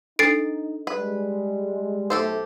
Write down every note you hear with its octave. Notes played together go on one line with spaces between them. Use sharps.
D4 D#4 A4 A6 C7 D7
G3 G#3 B4
B1 A3 G4 A4 C5